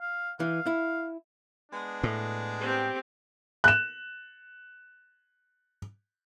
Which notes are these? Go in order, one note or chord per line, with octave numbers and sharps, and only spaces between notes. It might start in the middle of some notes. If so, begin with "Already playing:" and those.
F5
E3 F5
E4
G#3 B3 D4
A2
C4 G4
F#6 E7